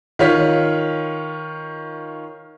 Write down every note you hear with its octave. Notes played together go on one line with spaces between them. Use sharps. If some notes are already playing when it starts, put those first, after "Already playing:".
D#3 F4 C#5 B6